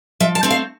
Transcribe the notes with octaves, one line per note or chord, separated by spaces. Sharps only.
F3 E5
A5
A3 C4
F5